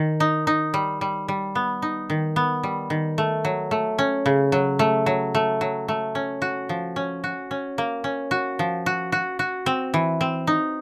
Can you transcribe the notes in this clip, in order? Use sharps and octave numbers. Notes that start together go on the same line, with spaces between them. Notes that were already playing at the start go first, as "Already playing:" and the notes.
Already playing: D#3
D#4
D#4
G3
G3
G3
B3
D#4
D#3
B3
G3
D#3
A3
F#3
A3
C#4
C#3
F#3
A3
F#3
A3
F#3
A3
C#4
F#4
F3
C#4
F#4
C#4
A#3
C#4
F#4
F3
F#4
F#4
F#4
C4
E3
C4
D#4